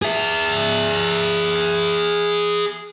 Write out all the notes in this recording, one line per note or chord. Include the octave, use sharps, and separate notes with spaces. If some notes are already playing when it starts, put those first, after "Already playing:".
G#4 E5